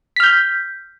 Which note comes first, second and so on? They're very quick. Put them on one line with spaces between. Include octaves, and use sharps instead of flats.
B6 F6 G6